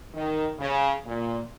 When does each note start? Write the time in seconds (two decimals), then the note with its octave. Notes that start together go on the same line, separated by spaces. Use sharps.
0.14 D#3
0.59 C#3
1.05 A#2